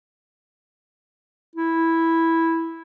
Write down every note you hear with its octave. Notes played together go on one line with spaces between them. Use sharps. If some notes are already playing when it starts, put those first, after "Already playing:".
E4